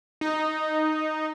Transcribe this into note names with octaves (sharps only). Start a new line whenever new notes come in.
D#4